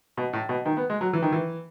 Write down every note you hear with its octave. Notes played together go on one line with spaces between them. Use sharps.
B2
A2
B2
D#3
B3
G#3
F#3
E3
D#3
E3